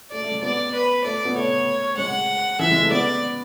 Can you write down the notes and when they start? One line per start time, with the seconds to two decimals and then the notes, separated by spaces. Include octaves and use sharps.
0.11 A3 D5
0.22 A3
0.31 G#3
0.42 B3 D5
0.73 B4
1.04 A3 D5
1.25 B3
1.35 A3 C#5
1.97 G#3 F#5
2.59 E3 E5
2.70 G#3
2.81 A3
2.91 B3 D5